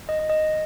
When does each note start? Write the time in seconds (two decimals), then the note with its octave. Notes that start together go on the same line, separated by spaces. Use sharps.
0.09 D#5
0.19 D#5
0.30 D#5